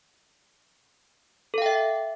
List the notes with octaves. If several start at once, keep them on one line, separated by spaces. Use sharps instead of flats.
A4 E5 F5 G5